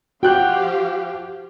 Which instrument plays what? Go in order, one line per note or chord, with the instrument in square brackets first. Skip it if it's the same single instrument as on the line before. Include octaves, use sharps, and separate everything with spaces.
[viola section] F3 G4 F5 [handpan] F#4 [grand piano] G5 F#6 G6